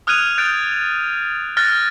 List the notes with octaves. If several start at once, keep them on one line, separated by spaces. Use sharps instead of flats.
D#6 F6 F#6 G#6 D#7 F7
F#6 G6 A6 D7
F6 F#6 A6 A#6